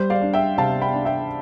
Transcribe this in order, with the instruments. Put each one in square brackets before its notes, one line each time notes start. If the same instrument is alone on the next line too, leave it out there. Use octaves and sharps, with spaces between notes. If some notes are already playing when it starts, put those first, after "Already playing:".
Already playing: [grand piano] G3 C5
D5 F5
D4
E5 G5
C3 F5 A5
G5 B5
D4
E5 G5